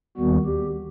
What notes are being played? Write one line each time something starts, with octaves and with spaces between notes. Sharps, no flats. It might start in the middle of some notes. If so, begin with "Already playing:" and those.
D#2 D#3 G3 B3 F#4
G4